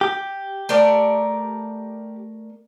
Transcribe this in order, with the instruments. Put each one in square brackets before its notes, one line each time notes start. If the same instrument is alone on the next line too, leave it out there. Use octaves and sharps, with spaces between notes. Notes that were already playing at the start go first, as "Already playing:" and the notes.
[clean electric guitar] G4
[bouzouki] A3 A#4 D5